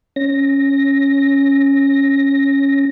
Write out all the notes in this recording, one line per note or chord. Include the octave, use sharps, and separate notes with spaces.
C#4 A#6